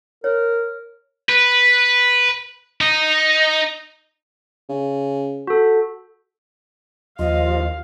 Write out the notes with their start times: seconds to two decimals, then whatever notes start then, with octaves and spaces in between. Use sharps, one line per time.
0.24 A#4 C#5
1.29 B4
2.81 D#4
4.69 C#3
5.47 F#4 A4
7.19 D#2 F3 F4 D#5 F5